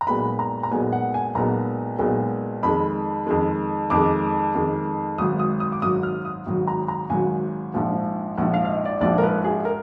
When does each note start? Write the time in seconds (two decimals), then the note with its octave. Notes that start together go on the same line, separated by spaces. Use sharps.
0.01 A#5
0.07 B1 A#2 G#3 B3 B5
0.39 A#5
0.63 A#5
0.71 B1 A#2 G#3 B3 G#5
0.92 F#5
1.14 G#5
1.35 B1 A#2 G#3 B3 A#5
1.99 B1 A#2 G#3 B3
2.63 F2 D#3 G#3 B5
3.27 F2 D#3 G#3
3.90 F2 D#3 G#3 D6
4.55 F2 D#3 G#3
5.18 G#1 G#2 F#3 D#6
5.39 D#6
5.60 D#6
5.72 D6
5.82 G#1 G#2 F#3 D#6
6.03 F6
6.25 D#6
6.46 G#1 G#2 F#3
6.67 A#5
6.88 A#5
7.10 G#1 G#2 F#3 G#5
7.74 A#1 G#2 F3
8.38 A#1 G#2 F3 F#5
8.54 F5
8.65 F5
8.69 D#5
8.85 D5
9.01 A#1 G#2 F3 D5
9.18 A#4
9.23 B4
9.44 G#4
9.65 A#4